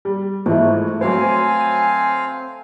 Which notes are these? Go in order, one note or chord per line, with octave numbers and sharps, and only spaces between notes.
G3
G#2 E3 F3 A3 B4
F#3 C4 C5 F5 F#5 G#5 D6